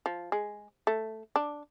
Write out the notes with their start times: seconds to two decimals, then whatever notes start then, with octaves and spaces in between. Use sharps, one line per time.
0.06 F3
0.32 G#3
0.87 A3
1.36 D4